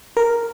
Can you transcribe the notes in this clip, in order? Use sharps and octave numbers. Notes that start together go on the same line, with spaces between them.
A#4